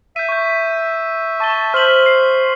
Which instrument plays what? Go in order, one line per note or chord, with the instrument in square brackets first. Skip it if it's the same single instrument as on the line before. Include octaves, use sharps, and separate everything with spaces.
[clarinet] E5 [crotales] G6 D#7
[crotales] C#6 G6
[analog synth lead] A5 [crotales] C#6 D#7 G7
[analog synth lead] C5 [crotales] F6 B6 F#7
[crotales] C7